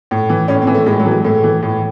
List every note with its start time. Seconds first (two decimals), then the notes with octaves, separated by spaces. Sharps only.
0.11 A2
0.29 E3
0.48 A2 C#4
0.62 C4
0.67 E3
0.75 A3
0.86 A2 G#3
1.00 F#3
1.06 E3
1.11 G#3
1.24 A2 A3
1.44 E3
1.63 A2